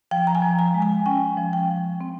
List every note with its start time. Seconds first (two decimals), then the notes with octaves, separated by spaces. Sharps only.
0.11 F3 G5
0.27 A#5
0.35 G#5
0.42 F3
0.59 G#5
0.74 G#3
0.82 G#5
1.06 C#4 G5
1.37 F3
1.53 G5
1.69 F3
2.01 C4